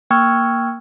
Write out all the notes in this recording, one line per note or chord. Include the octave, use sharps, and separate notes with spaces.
A#3 G5 C#6 E6 F6 G#6